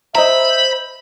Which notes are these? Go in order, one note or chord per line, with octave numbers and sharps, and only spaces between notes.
C5 D#5 E5 A#5 B5